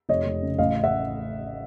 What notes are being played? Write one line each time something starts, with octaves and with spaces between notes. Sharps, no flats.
F1 C#5 D#5
F1
C#3
A1 D#5 F5
E5 F#5